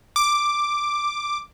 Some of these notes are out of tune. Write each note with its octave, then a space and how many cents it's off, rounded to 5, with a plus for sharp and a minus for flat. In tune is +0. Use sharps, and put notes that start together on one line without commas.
D6 +5